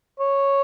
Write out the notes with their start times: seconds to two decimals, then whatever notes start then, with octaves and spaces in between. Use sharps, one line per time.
0.20 C#5